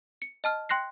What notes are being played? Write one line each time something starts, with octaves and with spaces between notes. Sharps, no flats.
C#7
D#5 A5 F6
G5 C6 F#6 A#6 C7